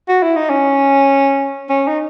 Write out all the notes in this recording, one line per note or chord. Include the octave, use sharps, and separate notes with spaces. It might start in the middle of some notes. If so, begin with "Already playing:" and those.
F#4
E4
D#4
C#4
C#4
D#4